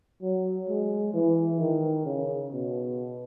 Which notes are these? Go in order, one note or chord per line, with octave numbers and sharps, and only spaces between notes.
F#3
G#3
E3
D#3
C#3
B2